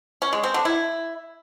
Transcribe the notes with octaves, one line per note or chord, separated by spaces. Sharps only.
C#4
G#3
C4
D3
E4